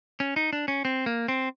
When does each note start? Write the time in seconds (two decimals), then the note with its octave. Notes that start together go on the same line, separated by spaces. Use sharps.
0.20 C#4
0.36 D#4
0.53 D4
0.68 C#4
0.85 C4
1.06 A#3
1.28 C4